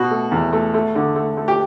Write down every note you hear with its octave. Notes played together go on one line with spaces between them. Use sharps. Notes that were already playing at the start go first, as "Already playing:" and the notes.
Already playing: B2 F#4
A3
E2
A3
A3
D3
A3
A3
G4